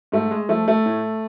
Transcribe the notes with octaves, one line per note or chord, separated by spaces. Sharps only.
G#2 A3
G#3
F3 A3
A3
A2